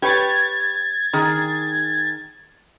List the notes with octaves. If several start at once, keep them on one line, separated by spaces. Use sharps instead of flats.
G4 B4 C#5 G#6 A6
D#3 G#4